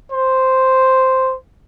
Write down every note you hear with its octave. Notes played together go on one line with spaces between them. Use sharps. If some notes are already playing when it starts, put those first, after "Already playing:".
C5